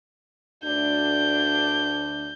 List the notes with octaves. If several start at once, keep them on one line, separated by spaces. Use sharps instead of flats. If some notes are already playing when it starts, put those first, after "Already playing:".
D2 D4 G6